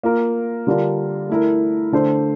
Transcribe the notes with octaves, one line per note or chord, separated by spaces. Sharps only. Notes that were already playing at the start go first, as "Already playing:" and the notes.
A#3 F4 A#4
D3 G3 D4 F4 A#4
A3 E4 A#4
D3 A3 D4 A4 C5